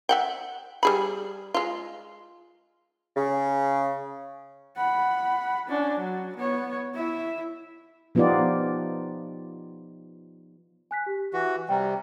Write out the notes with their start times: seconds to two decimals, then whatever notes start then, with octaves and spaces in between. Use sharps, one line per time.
0.09 E5 F#5 G5
0.83 G3 G#4 B5
1.54 G#3 F4
3.16 C#3
4.76 F#5 B5
5.67 C#4 D4
5.98 F#3
6.35 B3 C#5
6.94 E4 E5
8.15 F3 B3 D#4 F4 G4 D5
10.91 G#5 F#6 B6
11.06 G4
11.33 E3 F#4
11.69 C3 G3 G5 A#5